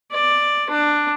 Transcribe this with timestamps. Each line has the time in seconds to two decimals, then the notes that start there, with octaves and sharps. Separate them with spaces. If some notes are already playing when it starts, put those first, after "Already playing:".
0.11 D5
0.70 D4